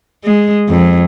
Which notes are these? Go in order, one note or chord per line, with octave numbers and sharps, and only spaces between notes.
G#3
F2